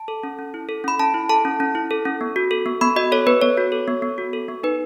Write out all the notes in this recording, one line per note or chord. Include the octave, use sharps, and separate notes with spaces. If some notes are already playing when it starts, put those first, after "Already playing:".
Already playing: A5
A4
C#4
C#4
E4
A4
C#4 B5
C#4 A5
E4
A4 A5
C#4
C#4
E4
A4
C#4
B3
F#4
A4
B3
B3 B5
F#4 D#5
A4 C#5
B3 B4
B3 C#5
F#4
A4
B3
B3
F#4
A4
B3
D#4 B4